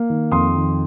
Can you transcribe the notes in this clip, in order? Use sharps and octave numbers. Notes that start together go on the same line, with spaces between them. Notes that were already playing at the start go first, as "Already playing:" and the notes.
Already playing: A#3
D#3
F2 C6 D#6
D#3